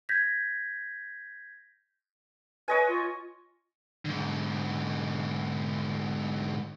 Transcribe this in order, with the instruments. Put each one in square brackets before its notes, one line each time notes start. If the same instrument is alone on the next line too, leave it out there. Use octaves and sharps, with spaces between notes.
[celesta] G6 G#6 A#6 B6
[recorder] B4 [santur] C#5 D#5 G#5
[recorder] F4
[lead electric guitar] G#2 D3